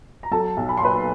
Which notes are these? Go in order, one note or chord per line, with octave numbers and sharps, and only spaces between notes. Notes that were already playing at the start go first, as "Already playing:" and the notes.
A#5
F#3 A4 A5
B1
B5
C6
A#2 B4 B5